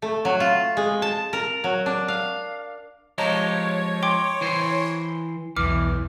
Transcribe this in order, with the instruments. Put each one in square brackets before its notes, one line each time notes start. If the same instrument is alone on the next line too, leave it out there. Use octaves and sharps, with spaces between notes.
[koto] A3
F#3
F4
G#3
A5
A#4
F#3
D4
F5
[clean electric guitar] F3 G#3 G4 [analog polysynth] C#5 [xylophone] D#5 A5 A#5
[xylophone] G5 C6 D6
[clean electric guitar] E3 C5
[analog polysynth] B1 E2 [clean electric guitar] E3 [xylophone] D6 F6